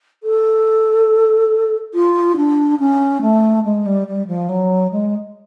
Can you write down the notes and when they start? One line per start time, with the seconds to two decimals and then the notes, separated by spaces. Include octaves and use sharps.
0.23 A4
1.94 F4
2.36 D4
2.79 C#4
3.21 A3
3.64 G#3
3.86 G3
4.07 G3
4.27 F3
4.49 F#3
4.91 G#3